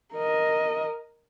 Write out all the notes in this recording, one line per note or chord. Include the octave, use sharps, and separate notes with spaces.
A#4 D#5